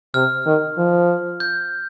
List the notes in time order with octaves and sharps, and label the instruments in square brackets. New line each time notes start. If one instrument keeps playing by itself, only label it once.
[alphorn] C3 [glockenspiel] F6
[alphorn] D#3
F3
[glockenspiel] G6